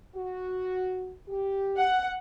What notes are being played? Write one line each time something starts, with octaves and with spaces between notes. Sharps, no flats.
F#4
G4
F#5